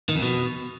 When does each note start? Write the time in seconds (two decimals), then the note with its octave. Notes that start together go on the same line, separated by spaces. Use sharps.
0.09 D#3
0.16 F2
0.22 B2